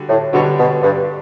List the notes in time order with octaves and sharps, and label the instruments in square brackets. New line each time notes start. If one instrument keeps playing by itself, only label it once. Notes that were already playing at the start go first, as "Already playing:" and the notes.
Already playing: [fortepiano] D3 G3 F#4
[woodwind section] A2
[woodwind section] B2 [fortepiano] D3 G3 D4 F#4 C#5
[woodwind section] B2
G2